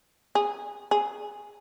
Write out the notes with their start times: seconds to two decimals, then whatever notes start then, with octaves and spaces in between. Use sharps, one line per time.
0.35 G#4
0.91 G#4